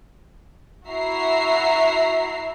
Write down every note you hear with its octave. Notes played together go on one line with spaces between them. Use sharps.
E4 F#4 E5 A#5 C7